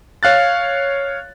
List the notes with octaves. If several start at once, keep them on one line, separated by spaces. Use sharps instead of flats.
C#5 F5 F#6 A6